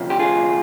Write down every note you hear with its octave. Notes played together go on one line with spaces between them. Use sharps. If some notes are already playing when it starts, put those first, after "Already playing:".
Already playing: D2 C3 F3
G4
F4 G#4